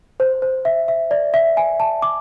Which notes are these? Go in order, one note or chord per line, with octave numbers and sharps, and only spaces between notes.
C5
C5
E5
E5
D5
E5
G#5
A5
D6